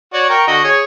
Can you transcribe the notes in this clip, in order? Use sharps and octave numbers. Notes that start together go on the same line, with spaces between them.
F#4 C#5 D5
A#4 G5 C#6
D3 F#4 D#5
G#4 C#5